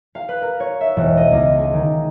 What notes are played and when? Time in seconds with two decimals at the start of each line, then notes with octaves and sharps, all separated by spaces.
0.15 F5
0.29 B4
0.42 A#4
0.60 C#5
0.81 E5
0.97 E1
1.17 D#5
1.32 C#2
1.58 G#4
1.73 D#3